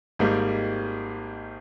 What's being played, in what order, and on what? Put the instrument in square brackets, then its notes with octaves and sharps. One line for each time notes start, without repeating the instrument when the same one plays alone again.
[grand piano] G#1 G#2 G3 A#3